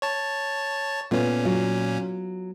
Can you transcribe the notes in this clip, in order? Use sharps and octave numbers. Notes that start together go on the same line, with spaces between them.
C#5 A5
A#2 A3 B3 C#4 F4
F#3 F4